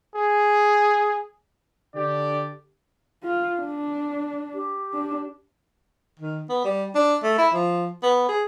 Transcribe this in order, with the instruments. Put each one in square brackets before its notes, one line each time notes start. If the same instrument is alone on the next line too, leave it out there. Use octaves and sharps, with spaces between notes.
[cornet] G#4
[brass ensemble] D3 D4 G4 [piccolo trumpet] D5
[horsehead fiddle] F4
D4
[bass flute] G4
[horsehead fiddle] D4
[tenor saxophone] D#3
B3
G3
D4
A3
E4
F3
B3
G#4